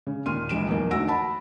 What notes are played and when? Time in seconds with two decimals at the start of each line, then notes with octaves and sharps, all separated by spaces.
0.07 C#3
0.26 D#2 A#2 C6 F6 D#7
0.49 C#2 E3 F3 D7 E7
0.67 B1 E2 A#3
0.91 D2 D#4 F#4 E6 A#6 D7
1.07 D#5 F#5 A5 B5